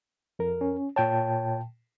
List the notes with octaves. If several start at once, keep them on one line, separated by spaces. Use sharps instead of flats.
F2 A#4
C#4
A#2 C#5 G5 A5